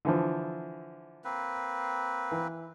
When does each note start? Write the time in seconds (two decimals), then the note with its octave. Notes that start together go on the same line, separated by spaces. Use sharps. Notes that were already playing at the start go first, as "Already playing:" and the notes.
0.05 D3 E3 F3
1.24 A#3 C4 B4
2.31 E3